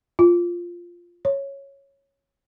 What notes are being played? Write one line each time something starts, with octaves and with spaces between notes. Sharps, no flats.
F4
C#5